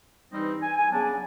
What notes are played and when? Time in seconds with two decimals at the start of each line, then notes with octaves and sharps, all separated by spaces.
0.32 G2 E3 G3 C4 D#4
0.62 G#5
0.76 G#5
0.91 C#3 F#3 B3 D4 A5
1.06 G#5